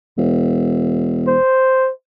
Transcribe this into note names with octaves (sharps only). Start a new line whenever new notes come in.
E1
C5